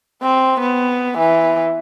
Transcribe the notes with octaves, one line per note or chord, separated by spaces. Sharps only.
C4
B3
E3